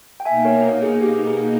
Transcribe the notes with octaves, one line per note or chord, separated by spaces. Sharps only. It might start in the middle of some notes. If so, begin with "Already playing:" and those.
G5
B2 A#3 D#4 E5 G#5
A#4 C#5
G#4
G4
G#4